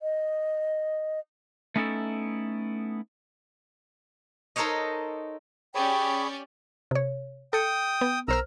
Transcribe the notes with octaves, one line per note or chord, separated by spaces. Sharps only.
D#5
A3 B3 C#4 D#4 E4 A4
D#4 A4 A#4 C5 C#5 D#5
C#4 G4 G#4 C#5 D5 G5 B5
C3 C#5
A4 G5 D#6 C#7
B3
B1 A#4 C5 A#5 E6 F6